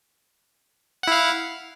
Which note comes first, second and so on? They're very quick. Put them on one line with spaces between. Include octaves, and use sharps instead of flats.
F#5 E4 F5